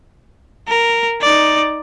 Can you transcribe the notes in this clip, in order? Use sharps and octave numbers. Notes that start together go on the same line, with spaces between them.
A#4
D#4 D5